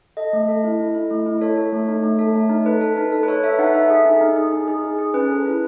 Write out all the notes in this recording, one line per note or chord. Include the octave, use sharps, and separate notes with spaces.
A4 D#5
A3
A4
E4
E4
E4
A3
E4
A4 C#5
A4
A3
D#4
A3
A4
A3
D#4
A4 B4
A4
D#4
A4
B4
A4 C#5
A4 E5
D#4 F#5
A4 E5
G#4
D#4
D#4
G#4
D#4
G#4
D#4
G#4
C#4 B4
A4
E4